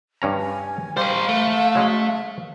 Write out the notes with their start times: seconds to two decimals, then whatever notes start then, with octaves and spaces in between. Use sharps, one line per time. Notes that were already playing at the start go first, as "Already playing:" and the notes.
0.22 G2 C#4 A#5
0.40 G#5
0.97 G3 A#4 C5 F5
1.28 A3
1.75 F#3 G#3 C#4